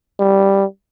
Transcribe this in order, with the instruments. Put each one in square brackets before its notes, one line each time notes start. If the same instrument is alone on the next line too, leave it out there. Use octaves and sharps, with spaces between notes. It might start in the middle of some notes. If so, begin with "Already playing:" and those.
[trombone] G3